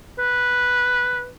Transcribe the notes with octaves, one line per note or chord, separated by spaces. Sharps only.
B4